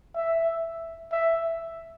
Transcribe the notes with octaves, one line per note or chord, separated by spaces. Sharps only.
E5
E5